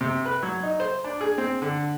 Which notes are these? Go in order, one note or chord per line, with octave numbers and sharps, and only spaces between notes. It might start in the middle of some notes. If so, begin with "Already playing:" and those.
C3
B4
F#3
D#4
C5
D4
G#4
C4
D3